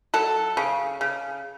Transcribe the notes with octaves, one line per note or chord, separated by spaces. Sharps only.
F#3 A4
C#3
C#3